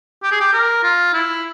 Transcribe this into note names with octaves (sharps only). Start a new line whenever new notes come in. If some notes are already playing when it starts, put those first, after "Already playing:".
G4
G#4
G4
A#4
F4
E4